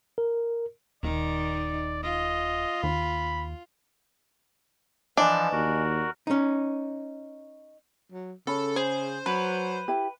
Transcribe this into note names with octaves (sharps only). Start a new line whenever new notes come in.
A#4
D#1 D#3 D#4 D5
F4 D#5
D#2 B5
E3 F3 D4 D#5 G#5
D#2 F#4 A#4
C#4 D#4
F#3
C#3 C#4 A4 B5
G#4 C5
F#3 B4
E4 G4